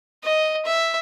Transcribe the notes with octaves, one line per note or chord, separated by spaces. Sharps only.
D#5
E5